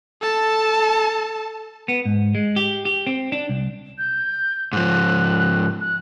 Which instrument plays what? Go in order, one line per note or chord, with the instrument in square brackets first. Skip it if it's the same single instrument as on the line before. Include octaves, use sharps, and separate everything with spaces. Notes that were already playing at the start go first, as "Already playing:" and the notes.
[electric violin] A4 A5
[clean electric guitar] B3
G#2
G#3
G4
G4
C4
D4
C2
[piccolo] G6
[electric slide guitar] G#2 F3 [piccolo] F#6
[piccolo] F#6